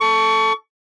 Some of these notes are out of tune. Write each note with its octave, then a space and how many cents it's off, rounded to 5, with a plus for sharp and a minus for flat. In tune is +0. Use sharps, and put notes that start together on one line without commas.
A4 +0 C#6 +25